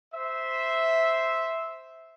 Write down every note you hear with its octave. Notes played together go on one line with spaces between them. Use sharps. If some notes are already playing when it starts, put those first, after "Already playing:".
C5 E5